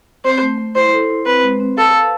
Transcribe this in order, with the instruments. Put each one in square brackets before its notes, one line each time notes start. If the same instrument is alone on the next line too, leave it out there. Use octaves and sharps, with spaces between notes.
[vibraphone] C4 [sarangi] C5
[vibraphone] A3
A3
[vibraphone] E4 [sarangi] C5
[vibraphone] A4
E4
[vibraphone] C4 [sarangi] B4
[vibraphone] G#3
C4
[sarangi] A4 [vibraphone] F5
[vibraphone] B4